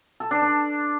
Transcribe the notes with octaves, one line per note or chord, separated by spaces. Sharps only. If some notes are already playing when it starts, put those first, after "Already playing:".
A4
D4
D4